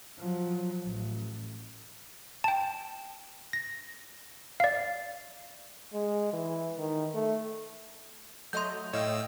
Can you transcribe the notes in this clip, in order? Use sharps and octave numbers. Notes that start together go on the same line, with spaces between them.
F3 F#3
A1
G5 A5
A#6
D5 F5
G#3
E3
D#3
A3
F#3 A3 D#5 C6 G6
A2 C#5 D#5 F5 G5 E6